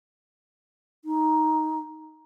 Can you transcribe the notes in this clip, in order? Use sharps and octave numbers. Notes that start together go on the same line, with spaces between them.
D#4